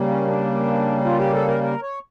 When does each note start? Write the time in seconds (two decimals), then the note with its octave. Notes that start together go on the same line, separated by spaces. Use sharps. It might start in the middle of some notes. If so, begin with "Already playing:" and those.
Already playing: C#3 G3 A#3
0.08 C#4
0.27 D4
1.05 F4
1.19 G4
1.33 A4
1.48 A#4
1.63 A#4
1.82 C#5